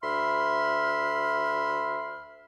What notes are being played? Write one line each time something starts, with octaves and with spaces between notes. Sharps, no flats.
D2 E5 B5 C6 F6